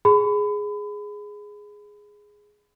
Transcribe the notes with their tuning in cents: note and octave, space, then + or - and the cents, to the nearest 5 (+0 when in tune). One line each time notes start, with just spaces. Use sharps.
G#4 +0 B5 +30